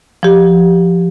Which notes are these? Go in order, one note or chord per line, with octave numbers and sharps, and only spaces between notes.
F3 G4